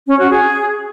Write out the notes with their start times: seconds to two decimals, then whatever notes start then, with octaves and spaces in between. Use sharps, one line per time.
0.06 C#4
0.18 F#4
0.30 G#4